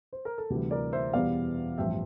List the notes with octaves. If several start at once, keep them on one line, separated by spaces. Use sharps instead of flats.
C5
A#4
A4
D2 C3 E3 G3 G4
A#4 D5
C5 E5
E1 E2 E3 G3 D5 F5
A1 G2 F3 E5 G5